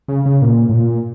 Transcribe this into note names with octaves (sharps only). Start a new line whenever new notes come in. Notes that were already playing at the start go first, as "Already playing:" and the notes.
C#3
C#3
A#2
A2
A#2